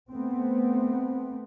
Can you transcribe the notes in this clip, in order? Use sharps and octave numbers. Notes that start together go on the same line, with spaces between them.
A3 B3 C4